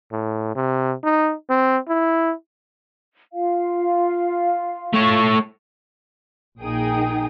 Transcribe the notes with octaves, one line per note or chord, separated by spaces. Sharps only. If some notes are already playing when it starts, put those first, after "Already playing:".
A2
C3
D#4
C4
E4
F4 F5
A3 C#5
A#1 A#3 D#4 G#4 G5 D#6